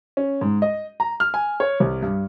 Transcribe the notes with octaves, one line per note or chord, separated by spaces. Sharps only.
C#4
G#2
D#5
A#5
F6
G#5
C#5
C2
G2